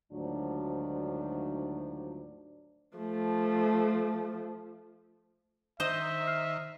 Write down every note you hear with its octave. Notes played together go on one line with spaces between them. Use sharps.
D2 G#2 D#3 F3 F#3 D4
F3 A3
D#3 C5 D#5 E5
E6 F6 C7